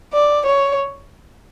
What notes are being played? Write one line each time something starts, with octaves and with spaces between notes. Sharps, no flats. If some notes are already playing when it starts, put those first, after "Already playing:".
D5
C#5